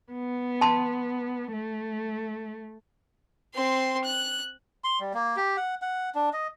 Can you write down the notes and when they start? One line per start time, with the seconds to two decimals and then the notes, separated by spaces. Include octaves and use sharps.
0.13 B3
0.61 A5 C6
1.53 A3
3.55 C4 C6
4.05 F#6
4.84 C6
5.00 G3
5.14 A#3
5.37 G4
5.57 F#5
5.82 F#5
6.15 D4
6.33 D#5